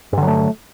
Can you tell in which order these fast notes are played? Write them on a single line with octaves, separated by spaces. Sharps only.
G2 D3 F#3 A3